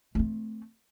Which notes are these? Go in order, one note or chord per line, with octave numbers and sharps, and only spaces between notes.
A3 C4